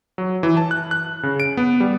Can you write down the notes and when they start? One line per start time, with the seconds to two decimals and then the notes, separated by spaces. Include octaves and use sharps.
0.18 F#3
0.43 E3
0.57 A5
0.71 F#6
0.91 F#6
1.23 C#3
1.40 D7
1.57 B3
1.80 G3